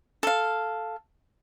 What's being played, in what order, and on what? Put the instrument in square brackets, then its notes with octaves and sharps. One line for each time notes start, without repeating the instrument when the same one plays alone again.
[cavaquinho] A4 F5